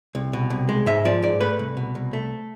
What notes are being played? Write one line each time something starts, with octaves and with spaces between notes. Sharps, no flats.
C2
B2
C2
G#3
G#2 E5
F3 D5
G#2 D5
A3 B4
C2
B2
C2
A3